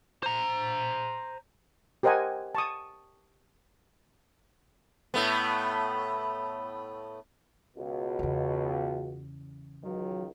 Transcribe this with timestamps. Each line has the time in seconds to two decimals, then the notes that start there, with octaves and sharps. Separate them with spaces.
0.23 C5 A#5
2.03 G4 A#4 C5 D#5 F#5 G#5
2.55 A5 C#6 D#6
5.14 A2 A3 B3
7.77 C#2 B2 F#4
8.19 E2 C#3
9.84 C#2 D#3 F#3